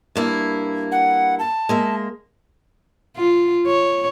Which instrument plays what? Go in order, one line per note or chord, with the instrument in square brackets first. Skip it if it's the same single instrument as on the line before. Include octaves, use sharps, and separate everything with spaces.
[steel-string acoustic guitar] G2 A#3 E4
[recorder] F#5
A5
[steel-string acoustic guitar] G#3 A#3 E5
[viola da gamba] F4
C#5